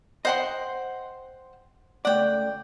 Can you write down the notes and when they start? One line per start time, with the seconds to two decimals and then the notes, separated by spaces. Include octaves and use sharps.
0.25 C5 D#5 F#5 G5 C6
2.05 C#2 A3 D5 F#5 G5